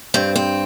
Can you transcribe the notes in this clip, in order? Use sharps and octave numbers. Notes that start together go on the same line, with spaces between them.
G2 C4
C4